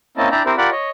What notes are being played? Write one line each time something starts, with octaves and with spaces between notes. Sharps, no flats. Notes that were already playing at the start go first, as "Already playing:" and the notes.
A#3 C4 C#4 E4 D#5 A5
D4 E4 D5 E5 G5 A#5
C4 E4 G4 A#4 C5
F4 G4 A#4 D5 F#5 B5
C#5 D#5